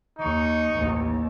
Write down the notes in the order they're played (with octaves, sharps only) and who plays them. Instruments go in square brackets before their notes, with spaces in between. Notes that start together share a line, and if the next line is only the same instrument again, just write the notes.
[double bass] D#2 [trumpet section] D#4 C#6
[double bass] A1 D#2